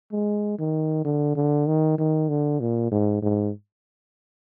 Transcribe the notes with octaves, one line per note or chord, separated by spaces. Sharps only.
G#3
D#3
D3
D3
D#3
D#3
D3
A#2
G#2
G#2